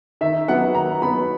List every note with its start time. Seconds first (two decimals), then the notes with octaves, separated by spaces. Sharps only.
0.21 D#3 E5
0.48 F#3 B3 F#5
0.75 D#3 A#5
1.02 F#3 B3 B5